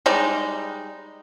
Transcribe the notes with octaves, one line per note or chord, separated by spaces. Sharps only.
G3 G#3 D#4